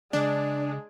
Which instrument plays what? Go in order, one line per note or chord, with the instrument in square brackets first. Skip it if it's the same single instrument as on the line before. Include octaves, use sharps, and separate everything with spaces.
[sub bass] C#3 [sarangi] G#3 [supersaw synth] D4 [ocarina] D5